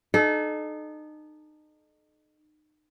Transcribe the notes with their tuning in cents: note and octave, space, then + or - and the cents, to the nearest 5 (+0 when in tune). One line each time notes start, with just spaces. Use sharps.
D#4 -30 A4 -35